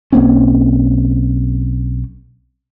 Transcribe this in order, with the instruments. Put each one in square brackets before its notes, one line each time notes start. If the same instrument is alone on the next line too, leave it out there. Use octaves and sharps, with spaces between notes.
[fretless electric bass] B1 A#3 C4 C#4